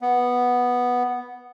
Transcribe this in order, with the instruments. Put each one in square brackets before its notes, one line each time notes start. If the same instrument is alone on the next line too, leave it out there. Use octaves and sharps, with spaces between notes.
[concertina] B3